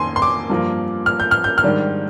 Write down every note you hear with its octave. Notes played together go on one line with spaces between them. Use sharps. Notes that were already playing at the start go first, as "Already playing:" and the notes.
Already playing: F2 D#3 A#3 G#5 C6
C6
D6
G2 F3 A#3
F6
G6
F6
G6
F6
G#2 D#3 G3 D4